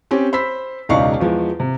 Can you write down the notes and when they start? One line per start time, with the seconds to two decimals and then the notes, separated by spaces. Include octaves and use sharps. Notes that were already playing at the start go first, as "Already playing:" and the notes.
0.11 C4 C#4 G4
0.33 C5 B5 E6 B6
0.89 E1 C#2 D#4 D5 F5 C#6
1.20 E2 F3 G#3
1.60 C3